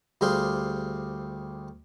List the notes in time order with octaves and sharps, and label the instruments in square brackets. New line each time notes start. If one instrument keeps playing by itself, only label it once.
[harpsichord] D2 G3 G#4 C5 F5 C6